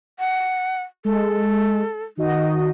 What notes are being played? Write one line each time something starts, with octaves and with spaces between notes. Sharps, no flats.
F#5
G#3 A4
D#3 D#4 F#4 D#5